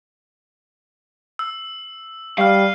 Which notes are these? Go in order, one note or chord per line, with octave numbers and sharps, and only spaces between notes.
E6
G3 F5 C#6 F6